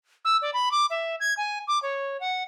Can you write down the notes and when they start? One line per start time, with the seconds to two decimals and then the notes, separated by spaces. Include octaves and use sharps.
0.25 E6
0.42 D5
0.54 B5
0.71 D6
0.90 E5
1.20 G#6
1.37 G#5
1.68 D6
1.82 C#5
2.20 F#5